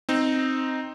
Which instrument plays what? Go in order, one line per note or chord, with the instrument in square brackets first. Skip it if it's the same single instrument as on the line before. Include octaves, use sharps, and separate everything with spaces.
[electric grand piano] C4 D#4